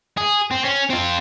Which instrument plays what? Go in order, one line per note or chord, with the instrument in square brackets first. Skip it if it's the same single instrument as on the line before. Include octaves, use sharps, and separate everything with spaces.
[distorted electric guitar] G#4
C4
C#4
C4 F4